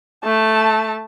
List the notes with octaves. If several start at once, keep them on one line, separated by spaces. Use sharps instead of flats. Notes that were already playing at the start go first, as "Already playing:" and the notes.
A3 A5